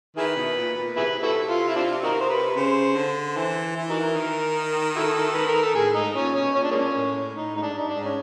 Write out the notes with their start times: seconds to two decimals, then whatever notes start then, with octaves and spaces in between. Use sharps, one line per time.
0.17 D#3 E4 G#4 B4
0.36 B2
0.58 A#2
0.77 A#2
0.97 C3 E4 G#4 B4
1.23 E4 F#4 A4
1.50 F4
1.68 E4
1.76 C4 D4 F4
2.03 D#4 F#4 A#4
2.20 C5
2.29 B4
2.56 C#3 C5
2.96 D3
3.36 E3 C5
3.76 E3
3.90 D#4 F#4 A#4
4.16 D#3
4.96 E4 F#4 A4
5.33 B4
5.48 A#4
5.62 A4
5.75 A2 G#4
5.95 G#2 D#4
6.15 A#2 C#4
6.35 B2 C#4
6.55 A#2 C#4
6.63 D4
6.71 G#3 A#3 C#4
6.96 A2
7.34 A2 D#4
7.55 G#2 D#4
7.62 D4
7.75 G2 D#4
7.88 D4
7.95 G#2
8.04 C#4